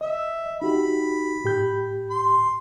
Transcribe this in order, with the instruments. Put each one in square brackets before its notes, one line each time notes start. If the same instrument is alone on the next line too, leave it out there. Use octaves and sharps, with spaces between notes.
[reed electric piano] D#5 [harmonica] E5
[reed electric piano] D#4 F#4 G4 [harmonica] B5
[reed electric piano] A2 G4 G6
[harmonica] C6